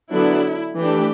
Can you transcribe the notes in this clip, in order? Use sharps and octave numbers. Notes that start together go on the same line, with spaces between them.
D3 F#3 B3 D4 E4
E3 A3 D4 G4